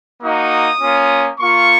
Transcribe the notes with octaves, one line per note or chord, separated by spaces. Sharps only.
A#3 D#4 F#4 D#6
A#3 C#4 F4
A#3 F4 C#6